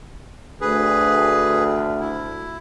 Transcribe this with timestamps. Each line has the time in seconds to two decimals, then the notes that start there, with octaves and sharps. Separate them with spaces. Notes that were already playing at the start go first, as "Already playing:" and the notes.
0.61 D2 G#4 B4
2.01 E4